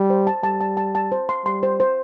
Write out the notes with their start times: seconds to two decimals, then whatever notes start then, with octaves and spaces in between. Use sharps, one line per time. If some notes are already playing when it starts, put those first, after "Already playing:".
Already playing: G3
0.10 C5
0.27 A5
0.43 G3 A5
0.61 A5
0.77 A5
0.95 A5
1.12 C5
1.29 C6
1.45 G3 C6
1.63 C5
1.80 C5